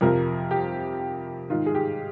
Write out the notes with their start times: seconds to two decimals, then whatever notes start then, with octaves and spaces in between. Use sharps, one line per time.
0.01 F2 C3 F3 A#4
0.51 G4
1.50 G#2 D#3 F4
1.66 G#4
1.75 G4